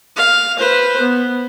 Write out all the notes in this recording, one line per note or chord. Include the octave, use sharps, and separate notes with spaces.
F5
B4 C5
B3